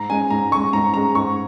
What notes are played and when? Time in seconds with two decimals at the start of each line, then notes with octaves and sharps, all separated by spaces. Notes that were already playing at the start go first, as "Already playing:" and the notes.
Already playing: G#2 A#5
0.10 G#3 C#4 G#5
0.30 G#2 A#5
0.51 G#3 C#4 C#6
0.73 G#2 A#5
0.94 G#3 C#4 A#5
1.15 G#2 C#6